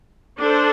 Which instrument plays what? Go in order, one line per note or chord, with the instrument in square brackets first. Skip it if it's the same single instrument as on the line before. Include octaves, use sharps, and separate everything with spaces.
[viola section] D4 A4 C5